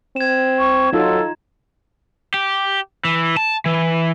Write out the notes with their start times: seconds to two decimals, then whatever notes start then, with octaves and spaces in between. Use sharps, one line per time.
0.16 C4 G#6 E7
0.59 C#6
0.93 F#3 D#4 F4 A4
2.34 G4
3.05 E3
3.37 A5
3.66 E3